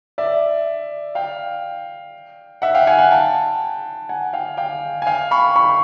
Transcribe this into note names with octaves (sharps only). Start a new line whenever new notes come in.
D5 E5
F5 G5
E5 F#5
F5 G5
F#5 G#5
F#5 G#5
G5 A5
F#5 G#5
F5 G5
F5 G5
G#5
F5 G5
B5 C#6
B5 C#6